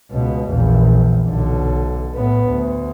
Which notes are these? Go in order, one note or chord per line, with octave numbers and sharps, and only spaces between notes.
C#2 B2
A#1 E2
B1 D3
A2 B3
D2